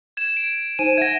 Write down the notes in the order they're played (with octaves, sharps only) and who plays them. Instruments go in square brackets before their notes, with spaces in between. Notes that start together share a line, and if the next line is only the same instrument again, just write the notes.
[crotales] G#6 E7
D7
[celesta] D#4 C5 G#5 [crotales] D#7
[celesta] E5 F#5 [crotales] G#6 A#6